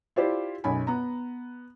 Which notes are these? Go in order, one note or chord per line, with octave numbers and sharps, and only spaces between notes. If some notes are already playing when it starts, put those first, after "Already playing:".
E4 F4 G4 C5 D5
B1 F#2 G#5 B5
B3 A#5